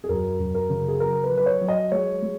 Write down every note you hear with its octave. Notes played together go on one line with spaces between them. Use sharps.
G#4
F#2 A#4
F#2
A#4
C#3
G#4
F#3 A#4
B4
F#3
B4
C#5
F#3
D#5
G#3 C#5
G#3